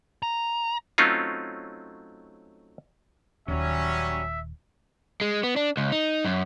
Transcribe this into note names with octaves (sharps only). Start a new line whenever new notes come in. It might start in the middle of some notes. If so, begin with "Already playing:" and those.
A#5
F#3 A3 C4 C#4 D#4 F4
D#1 D#2 F#3 G3 C#4 E5
G#3
B3
D4
C#2
D#4
F#2